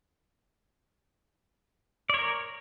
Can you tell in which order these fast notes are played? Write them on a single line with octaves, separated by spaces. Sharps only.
D5 C#5 A#4